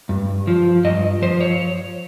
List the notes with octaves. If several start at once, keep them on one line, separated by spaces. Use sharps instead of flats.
G2
F3
G2 D#5
F3 C5
C#5